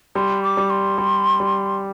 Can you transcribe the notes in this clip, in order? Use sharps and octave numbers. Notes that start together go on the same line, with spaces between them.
G3 C6
D6
G3
C6
G3
G3